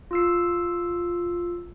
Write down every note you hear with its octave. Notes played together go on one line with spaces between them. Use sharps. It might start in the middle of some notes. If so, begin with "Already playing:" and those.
F4 E6 C7